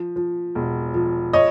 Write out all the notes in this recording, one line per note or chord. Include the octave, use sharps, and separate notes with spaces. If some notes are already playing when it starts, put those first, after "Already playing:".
Already playing: F3
F3
E1
F3
C#5 D#5